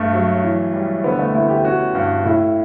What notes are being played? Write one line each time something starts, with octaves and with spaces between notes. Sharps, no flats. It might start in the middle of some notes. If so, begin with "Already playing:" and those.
Already playing: G2 A3
F#3
E3
G3
D3 B3
A3
D2 E4
G4
C#4 F#4
G2
A2 E4